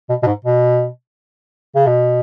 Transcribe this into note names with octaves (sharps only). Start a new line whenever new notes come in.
B2
B2
G#2
B2
C#3
B2